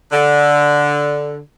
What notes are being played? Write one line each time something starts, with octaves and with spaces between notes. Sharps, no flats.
D3